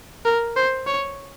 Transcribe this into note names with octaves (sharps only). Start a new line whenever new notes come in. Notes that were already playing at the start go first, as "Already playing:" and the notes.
A#4
C5
C#5